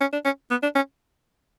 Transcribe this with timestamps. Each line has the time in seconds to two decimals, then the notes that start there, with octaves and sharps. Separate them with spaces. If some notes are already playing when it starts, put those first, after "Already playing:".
0.01 C#4
0.13 D4
0.25 C#4
0.51 B3
0.63 D4
0.75 C#4